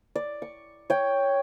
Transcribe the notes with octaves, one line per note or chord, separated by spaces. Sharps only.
D5
C#6
C#5 G5